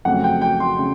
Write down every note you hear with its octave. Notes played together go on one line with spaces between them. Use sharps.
F2 C#3 F#3 A3 F#5
G5
G5
C6
C#3